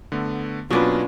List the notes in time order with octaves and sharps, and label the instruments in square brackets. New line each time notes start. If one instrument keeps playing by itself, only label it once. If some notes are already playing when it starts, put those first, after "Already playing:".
[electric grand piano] D3 A3 B3
[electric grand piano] B2 F#3 A#3 [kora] C#4 D4 B4 [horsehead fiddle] F4